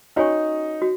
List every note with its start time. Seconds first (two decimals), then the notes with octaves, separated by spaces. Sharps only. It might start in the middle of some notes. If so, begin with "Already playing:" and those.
0.16 C#4 D#4 F#4 C#5 G#5 C#6
0.82 F#4